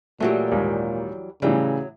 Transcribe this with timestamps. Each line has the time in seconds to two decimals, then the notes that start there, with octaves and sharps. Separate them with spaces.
0.20 A#2 E3 F#3 G3 A3 F#4
0.52 D#2 G#2
1.42 A2 C#3 E3 F#3 G3